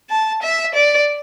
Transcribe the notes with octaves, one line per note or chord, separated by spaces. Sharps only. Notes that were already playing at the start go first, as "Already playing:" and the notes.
A5
E5
D5